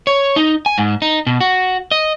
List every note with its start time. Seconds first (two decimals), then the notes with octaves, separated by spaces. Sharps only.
0.07 C#5
0.36 D#4
0.66 G#5
0.78 G#2
1.02 D#4
1.27 B2
1.40 F#4
1.91 D#5